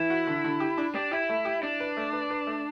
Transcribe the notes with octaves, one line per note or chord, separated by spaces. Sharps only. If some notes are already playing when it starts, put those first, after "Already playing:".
Already playing: E3 E4
F#4
D3
D3
G4
D4
D4 G4
E4 G4
A3
G4
D4 E4
B4
A3
B4
B4
A3